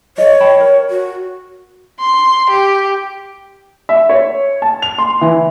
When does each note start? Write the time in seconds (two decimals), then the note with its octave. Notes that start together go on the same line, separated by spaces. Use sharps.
0.18 A4 C#5 D#5
0.40 G5 A5 B5
0.60 A#4
0.90 F#4
2.00 C6
2.50 G4
3.89 E5
4.09 C#5
4.62 A5
4.82 F7
4.98 C6
5.21 E3